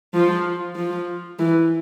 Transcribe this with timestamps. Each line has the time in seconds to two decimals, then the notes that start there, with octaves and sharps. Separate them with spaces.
0.14 F3
0.76 F3
1.39 E3